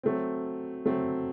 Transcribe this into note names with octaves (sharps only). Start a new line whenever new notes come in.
F#3 A3 C4
F#3 A3 C4